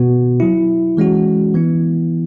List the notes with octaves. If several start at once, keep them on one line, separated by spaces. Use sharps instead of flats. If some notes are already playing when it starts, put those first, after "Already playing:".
Already playing: B2 B3 F#4
F#3 E4
E3 G#3 C#4 F#4
E3 B3 E4